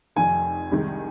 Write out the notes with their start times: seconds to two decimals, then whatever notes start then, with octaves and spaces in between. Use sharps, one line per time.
0.16 F1 F2 D#3 G#5
0.71 C2 C3 D#3 G#3